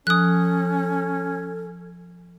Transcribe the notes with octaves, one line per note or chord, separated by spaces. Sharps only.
F3 C#4 A4 D#6 F#6